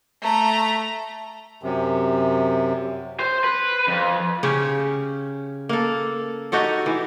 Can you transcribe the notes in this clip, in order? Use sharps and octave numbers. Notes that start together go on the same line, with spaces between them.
A3 A#5
F#2 C3
C5
B4
F2
C#3 C#4 G4
A#3 A4
D#4 F#4 G4 A4
E3